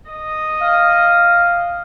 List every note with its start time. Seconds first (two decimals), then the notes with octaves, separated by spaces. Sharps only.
0.10 D#5
0.61 F5